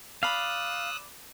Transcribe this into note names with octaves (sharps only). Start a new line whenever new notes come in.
D5 F5 B5 D#6 E6 F#6